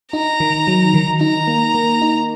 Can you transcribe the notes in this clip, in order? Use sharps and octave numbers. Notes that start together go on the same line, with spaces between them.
D#4 A#5
D#3
F#3
D#3
D#4 A#5
A#3
A#3
D#4